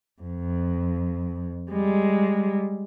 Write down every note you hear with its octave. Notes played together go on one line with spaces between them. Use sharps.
F2
G3 G#3